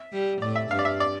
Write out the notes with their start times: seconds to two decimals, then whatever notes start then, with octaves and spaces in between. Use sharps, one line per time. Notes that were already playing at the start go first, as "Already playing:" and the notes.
Already playing: E5
0.13 G3
0.42 A2 D5
0.56 E5
0.70 G2 F5
0.79 D5
0.85 E5
1.00 D5